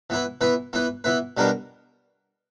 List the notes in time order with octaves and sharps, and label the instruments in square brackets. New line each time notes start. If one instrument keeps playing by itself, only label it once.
[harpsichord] E3 B3 E4 B4
E3 B3 E4 B4
E3 B3 E4 B4
E3 B3 E4 B4
B2 G3 B3 D4 A#4